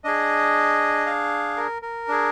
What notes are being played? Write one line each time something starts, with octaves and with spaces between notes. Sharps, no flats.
D4 G#4 D#5
F5
A#4
A#4
D4 G#4